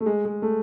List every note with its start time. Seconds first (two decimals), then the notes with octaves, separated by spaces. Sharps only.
0.01 A3
0.06 G#3
0.25 G#3
0.42 A3